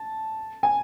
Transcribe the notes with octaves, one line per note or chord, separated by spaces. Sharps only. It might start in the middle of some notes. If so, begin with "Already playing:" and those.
Already playing: A5
G#5